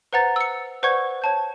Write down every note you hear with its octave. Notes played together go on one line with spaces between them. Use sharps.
B4 C5 F#5 A#5 A6
E6 C#7
B4 C5 D5 F#5 C#6 G#6
C#5 A5 G6